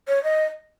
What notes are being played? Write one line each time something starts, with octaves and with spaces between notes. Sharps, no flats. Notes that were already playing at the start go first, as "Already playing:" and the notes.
C#5
D#5